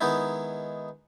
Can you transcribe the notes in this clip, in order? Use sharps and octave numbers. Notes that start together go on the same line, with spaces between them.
D#3 G#3 B3 D#4 E4